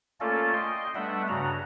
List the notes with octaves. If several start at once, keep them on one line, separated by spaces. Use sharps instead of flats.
A3 A#3 C#4 F4 A4 D5
D#5 G5 C6
G3 A3 B3 D4 E5 F#5
G2 C#3 F#4 A#5